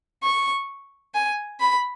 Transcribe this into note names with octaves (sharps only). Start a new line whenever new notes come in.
C#6
G#5
B5